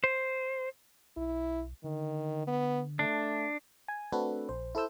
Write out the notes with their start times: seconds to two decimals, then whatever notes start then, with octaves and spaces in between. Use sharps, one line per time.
0.04 C5
1.17 B1 E4
1.84 D3 D#3
2.47 B3
2.99 A3 D4
3.88 G#5
4.13 A3 C4 D4 F#4 A4 B4
4.49 A#1 C5
4.75 E4 A4 C5 E6 G6